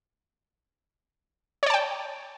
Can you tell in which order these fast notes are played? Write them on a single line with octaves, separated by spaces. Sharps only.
C#5 D5 A5 G5